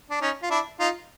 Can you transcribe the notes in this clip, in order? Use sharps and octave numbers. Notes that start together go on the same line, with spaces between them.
D4
C#4 D#4
F4
D4 E4
D#4 F4